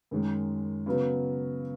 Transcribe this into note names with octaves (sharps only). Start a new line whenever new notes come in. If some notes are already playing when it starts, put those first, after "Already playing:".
F#2 D#3 G#3
C#3 F#3 B3